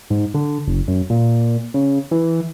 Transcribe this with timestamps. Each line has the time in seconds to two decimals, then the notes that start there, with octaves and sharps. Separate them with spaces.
0.10 G#2
0.34 D3
0.67 F#1
0.88 F#2
1.10 A#2
1.74 C#3
2.11 E3